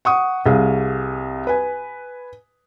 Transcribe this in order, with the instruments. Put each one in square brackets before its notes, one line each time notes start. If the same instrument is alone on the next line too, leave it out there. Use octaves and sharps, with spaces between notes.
[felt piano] F#5 C#6 D#6
C2 G#4 F5
B4 G#5